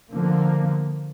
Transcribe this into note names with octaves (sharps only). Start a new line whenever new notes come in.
D3 F3 A#3